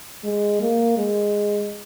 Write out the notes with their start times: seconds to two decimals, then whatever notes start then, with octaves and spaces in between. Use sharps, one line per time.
0.24 G#3
0.61 A#3
0.97 G#3